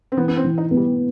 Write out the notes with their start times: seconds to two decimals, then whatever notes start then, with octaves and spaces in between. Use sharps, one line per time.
0.12 C4
0.17 E3 B3
0.28 B3
0.37 C4
0.44 E3
0.58 D#4
0.71 B3
0.77 G3